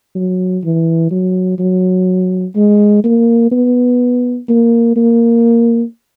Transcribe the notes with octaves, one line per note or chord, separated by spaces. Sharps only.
F#3
E3
F#3
F#3
G#3
A#3
B3
A#3
A#3